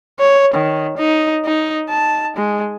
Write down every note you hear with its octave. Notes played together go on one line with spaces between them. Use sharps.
C#5
D#3
D#4
D#4
A5
G#3